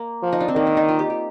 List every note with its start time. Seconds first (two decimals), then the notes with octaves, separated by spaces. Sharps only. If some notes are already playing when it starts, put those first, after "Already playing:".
Already playing: A#3
0.23 F3
0.33 D#4
0.40 D4
0.48 C4
0.55 D#3 A#3
0.67 D4
0.77 D#4
0.88 F4
0.99 G4
1.10 G4